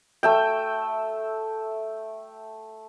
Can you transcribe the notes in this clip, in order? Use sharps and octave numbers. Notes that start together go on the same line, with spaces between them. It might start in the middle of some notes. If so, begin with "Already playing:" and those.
A3 E5 G5